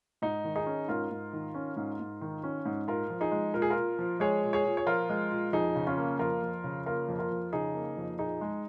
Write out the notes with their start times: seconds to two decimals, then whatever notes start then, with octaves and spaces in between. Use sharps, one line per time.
0.22 G#2 D#4
0.44 D#3
0.55 D#4 G#4
0.66 C#4
0.88 G#2 F4 A#4
1.10 G#2
1.33 D#3
1.54 C#4
1.77 G#2
2.00 G#2
2.21 D#3
2.44 C#4
2.66 G#2
2.88 A#2 F4 A#4
3.10 F3
3.21 D#4 G#4
3.32 G#3
3.54 A#2 A#4
3.62 G#4
3.70 F4 A#4
3.77 A#2
3.99 F3
4.20 G#3 G#4 C#5
4.43 A#2
4.53 G#4 C#5
4.65 A#2
4.77 C#5
4.86 F3 F4 A#4
5.10 G#3
5.31 A#2
5.53 F2 D#4 G#4
5.75 C#3
5.87 C#4 F4
5.97 A#3
6.19 F2 F4 A#4
6.42 F2
6.64 C#3
6.86 A#3 F4 A#4
7.08 F2
7.19 F4 A#4
7.31 F2
7.53 C#3 D#4 G#4
7.74 A#3
7.97 F2
8.18 A#2 D#4 G#4
8.41 G#3